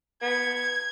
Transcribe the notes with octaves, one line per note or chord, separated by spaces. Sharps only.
B3 G#6